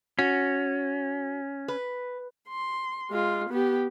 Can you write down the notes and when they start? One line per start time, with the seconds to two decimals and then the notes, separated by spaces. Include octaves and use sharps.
0.19 C#4 F#4
1.68 B4
2.48 C6
3.10 G#3 F4
3.49 B3 G4